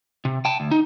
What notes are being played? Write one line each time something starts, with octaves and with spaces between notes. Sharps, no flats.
C3
G5 A5
D2
D#4